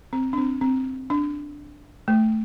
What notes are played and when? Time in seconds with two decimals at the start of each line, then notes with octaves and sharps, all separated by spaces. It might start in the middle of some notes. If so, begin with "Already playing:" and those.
0.13 C4
0.33 D4
0.38 C4
0.61 C4
1.10 D4
2.08 A3